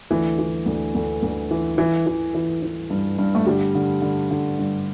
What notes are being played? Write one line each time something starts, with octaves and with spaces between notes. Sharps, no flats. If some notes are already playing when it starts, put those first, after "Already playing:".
D2 E3
E3
D2
D2
D2
E3
E3
E3
E3
E3
G2
G2
A3
D3 G3
D3
D3
D3
G2